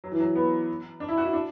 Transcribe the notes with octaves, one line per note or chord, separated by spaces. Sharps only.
F#3
E3
F#3
B3
D4
E4
F#4
E4
D4